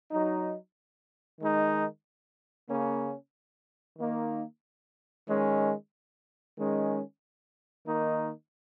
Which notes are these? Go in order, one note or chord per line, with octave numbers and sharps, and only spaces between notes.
F#3 D#4
D#3 G#3 D#4
C#3 A#3 C#4
D#3 A#3 D#4
D#3 G#3 C#4
D#3 G#3 C#4
D#3 A#3 D#4